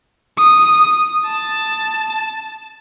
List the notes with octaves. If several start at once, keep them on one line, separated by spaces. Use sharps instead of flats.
D#6
A5